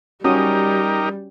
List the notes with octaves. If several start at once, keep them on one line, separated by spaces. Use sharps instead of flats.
G3 C#4 D#4 F#4 G4 A#4 D#6